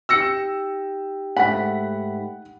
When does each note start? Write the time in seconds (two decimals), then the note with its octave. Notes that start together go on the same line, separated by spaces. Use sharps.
0.09 D#4 G4 G5 E6 A#6 C#7
1.37 G#2 A3 F#5 B5 B6